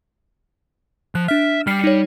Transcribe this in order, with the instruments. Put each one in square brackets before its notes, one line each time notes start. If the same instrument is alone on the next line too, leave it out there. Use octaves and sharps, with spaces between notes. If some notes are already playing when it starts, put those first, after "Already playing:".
[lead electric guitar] F3 [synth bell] F#6
[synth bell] D4 F6 [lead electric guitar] E5
[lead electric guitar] G3 [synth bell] F6 C7 C#7
[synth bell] D#4 C#5